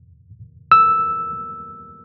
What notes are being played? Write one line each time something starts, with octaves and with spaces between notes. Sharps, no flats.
E6